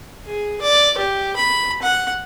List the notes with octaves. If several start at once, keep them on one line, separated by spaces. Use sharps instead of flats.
G#4
D5
G4
B5
F#5